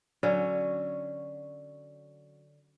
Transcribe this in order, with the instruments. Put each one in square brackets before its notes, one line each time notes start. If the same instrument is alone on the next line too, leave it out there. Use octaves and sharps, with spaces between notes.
[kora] D3 F#3 C#4